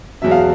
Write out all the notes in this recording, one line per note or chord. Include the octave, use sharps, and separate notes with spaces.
E2 B2 F#3 E5
F5